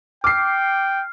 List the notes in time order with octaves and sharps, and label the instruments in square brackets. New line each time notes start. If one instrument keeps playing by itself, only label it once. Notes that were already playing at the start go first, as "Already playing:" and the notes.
[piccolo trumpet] G5 [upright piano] D6 C7 [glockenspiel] F6